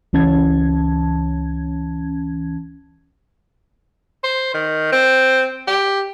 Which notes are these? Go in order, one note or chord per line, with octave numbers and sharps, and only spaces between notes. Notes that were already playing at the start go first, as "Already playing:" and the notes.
C#2 E3 C#4 A5 G#6
C5
D#3
C4
G4